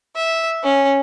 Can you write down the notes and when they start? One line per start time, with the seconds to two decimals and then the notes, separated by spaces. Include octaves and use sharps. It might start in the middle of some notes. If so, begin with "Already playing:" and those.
0.16 E5
0.64 C#4